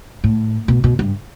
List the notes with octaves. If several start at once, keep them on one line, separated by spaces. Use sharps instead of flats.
A2
B2
B2
G2